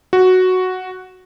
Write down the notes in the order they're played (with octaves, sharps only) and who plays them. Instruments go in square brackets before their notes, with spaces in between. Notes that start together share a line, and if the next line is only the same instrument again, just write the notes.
[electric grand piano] F#4